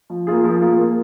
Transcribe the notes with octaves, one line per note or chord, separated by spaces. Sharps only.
F3
A#3 F4 G#4
F3
A#3 F4 G#4
A#3